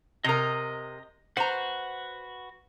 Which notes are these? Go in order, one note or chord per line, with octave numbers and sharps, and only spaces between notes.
C3 A#4 D#5 D#6
F#4 B4 C5 F#5 A#5